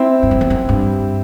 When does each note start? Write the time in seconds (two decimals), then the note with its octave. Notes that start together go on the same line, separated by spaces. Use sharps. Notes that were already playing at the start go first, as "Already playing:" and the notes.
Already playing: C4 E4
0.23 G2
0.31 F#2
0.41 E2
0.50 F#2
0.69 G2